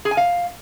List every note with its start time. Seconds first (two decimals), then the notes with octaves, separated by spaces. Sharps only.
0.05 G#4
0.11 G#5
0.17 F5